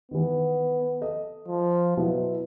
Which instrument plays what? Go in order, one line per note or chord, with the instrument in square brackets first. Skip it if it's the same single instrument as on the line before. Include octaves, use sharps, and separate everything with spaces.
[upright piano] D#3 E3 [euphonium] B3
[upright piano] A4 D#5
[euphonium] F3
[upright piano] B2 F#3 B3 [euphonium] E4